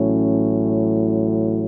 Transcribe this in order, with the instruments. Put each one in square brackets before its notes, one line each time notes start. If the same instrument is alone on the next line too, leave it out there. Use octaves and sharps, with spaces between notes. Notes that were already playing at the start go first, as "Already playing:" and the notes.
Already playing: [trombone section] A1 A2 F#3 C#4